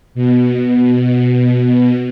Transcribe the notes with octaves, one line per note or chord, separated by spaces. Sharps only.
B2
B2